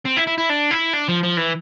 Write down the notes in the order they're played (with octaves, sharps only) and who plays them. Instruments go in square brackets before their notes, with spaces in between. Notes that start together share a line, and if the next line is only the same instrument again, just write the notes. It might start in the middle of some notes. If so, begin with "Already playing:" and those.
[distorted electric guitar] C4
E4
E4
E4
D4
E4
D4
F3
F3
E3